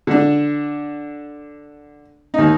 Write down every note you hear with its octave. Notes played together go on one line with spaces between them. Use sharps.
D3 D4
D#2 D#4